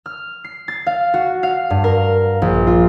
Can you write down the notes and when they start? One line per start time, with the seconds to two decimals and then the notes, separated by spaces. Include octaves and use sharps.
0.06 F6
0.44 C7
0.68 A6
0.87 F5
1.14 F#4
1.43 F5
1.70 G2
1.84 A#4
2.42 A#1
2.67 F4